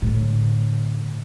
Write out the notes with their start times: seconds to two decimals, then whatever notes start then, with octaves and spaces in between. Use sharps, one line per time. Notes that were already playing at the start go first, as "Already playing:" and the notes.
0.02 A2 D3